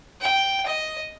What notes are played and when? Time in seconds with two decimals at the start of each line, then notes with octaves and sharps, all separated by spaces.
0.21 G5
0.66 D#5